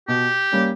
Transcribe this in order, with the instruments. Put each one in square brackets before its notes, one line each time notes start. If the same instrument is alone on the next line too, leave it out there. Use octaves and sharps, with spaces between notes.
[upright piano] B2 [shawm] G4
[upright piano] G3 A#3 C#4